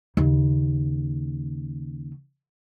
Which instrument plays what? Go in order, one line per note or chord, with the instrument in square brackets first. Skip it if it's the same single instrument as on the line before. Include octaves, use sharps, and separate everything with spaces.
[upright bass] D#2 C#3